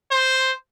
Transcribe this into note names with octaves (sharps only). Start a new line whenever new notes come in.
C5